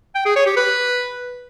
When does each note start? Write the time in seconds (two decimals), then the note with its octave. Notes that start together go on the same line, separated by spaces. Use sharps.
0.15 G5
0.25 G#4
0.36 C#5
0.46 G4
0.57 B4